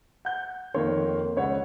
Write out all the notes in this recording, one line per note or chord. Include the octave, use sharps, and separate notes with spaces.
F#5 G6
F2 D#3 A#3 C#5 C6
C#2 C#5 F#5